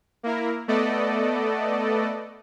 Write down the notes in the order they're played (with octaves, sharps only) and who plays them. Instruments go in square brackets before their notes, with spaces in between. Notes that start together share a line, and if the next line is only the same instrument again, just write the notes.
[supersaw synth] A#3 E4 A#4
A3 B3 A4 D5 D#5